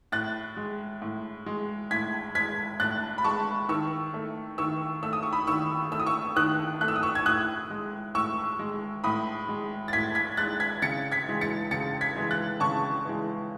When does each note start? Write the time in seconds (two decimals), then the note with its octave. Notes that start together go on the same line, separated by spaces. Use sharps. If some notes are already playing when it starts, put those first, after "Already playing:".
0.12 A2 F#6 A6
0.57 G#3
1.02 A2
1.46 G#3
1.91 A2 G#6 B6
2.35 G#3 G#6 B6
2.80 A2 F#6 A6
3.18 B5
3.24 G#3 A5 C#6
3.69 D#3 C#6 E6
4.14 A3
4.58 D#3 C#6 E6
5.03 A3 E6
5.13 D#6
5.23 C#6
5.33 B5 D#6
5.47 D#3 C#6 E6
5.92 A3 E6
6.00 D#6
6.06 C#6 E6
6.36 D#3 D#6 F#6
6.81 A3 F#6
6.88 E6
6.96 D#6
7.03 C#6 E6
7.15 G#6
7.26 A2 D#6 F#6
7.70 G#3
8.15 A2 C#6 E6
8.59 G#3
9.04 A2 B5 D#6
9.49 G#3
9.88 A6
9.93 A2 G#6 B6
10.15 G#6 B6
10.37 G#3 F#6 A6
10.60 G#6 B6
10.82 C#3 A6 C#7
11.12 G#6 B6
11.27 E3 G#3
11.41 A6 C#7
11.71 C#3 A6 C#7
12.01 G#6 B6
12.16 E3 G#3
12.31 F#6 A6
12.60 C#3 A5 C#6
13.05 E3 G#3